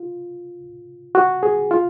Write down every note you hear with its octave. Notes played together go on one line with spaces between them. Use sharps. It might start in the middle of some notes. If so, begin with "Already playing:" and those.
Already playing: F4
F#4
G#4
F4